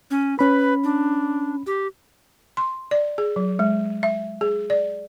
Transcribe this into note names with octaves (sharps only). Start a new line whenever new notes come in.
C#4
C#4 B4 B5
D4
G4
C6
D5
G#4
F#3
G#3
E5
G#4
D5